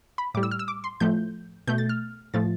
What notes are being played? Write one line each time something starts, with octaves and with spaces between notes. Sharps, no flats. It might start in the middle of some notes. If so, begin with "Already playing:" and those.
B5
A2 G3 D6
E6
F6
E6
D6
C6
A2 F3 A3 G6
B2 A3 G6
A6
F6
A2 F3 A3 A6